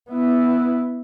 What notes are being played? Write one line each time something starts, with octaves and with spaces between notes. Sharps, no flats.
B3 E4